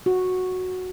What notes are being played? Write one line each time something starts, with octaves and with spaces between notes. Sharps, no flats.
F#4